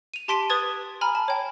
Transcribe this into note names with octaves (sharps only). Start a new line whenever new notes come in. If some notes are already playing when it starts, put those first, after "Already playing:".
D#7 F7
G4 A5 C6 B6 D7 D#7
B4 D#6 G#6 A6
G#5 A#5 B5 F6
A5
C#5 G5